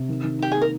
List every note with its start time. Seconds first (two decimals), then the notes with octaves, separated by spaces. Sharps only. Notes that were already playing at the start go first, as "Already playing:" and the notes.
Already playing: C3
0.09 D#3
0.24 D#3
0.39 D#4 G4
0.52 A#3 G#4
0.62 A#4